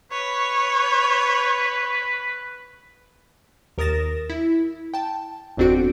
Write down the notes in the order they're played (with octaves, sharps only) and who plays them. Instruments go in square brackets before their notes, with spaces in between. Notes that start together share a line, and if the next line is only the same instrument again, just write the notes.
[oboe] B4 [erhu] C#5
[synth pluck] D#2 A#4 D#6 A6 A#6 E7
E4
G5 A5
G1 F2 C4 D4 F#4 D7